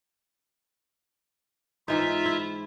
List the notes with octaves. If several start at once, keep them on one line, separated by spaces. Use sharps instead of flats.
G#2 E3 D#4 F4 E5
E4